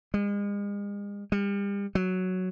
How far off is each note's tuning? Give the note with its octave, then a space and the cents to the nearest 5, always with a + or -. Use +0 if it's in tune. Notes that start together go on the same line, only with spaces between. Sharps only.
G#3 -40
G3 +40
F#3 +0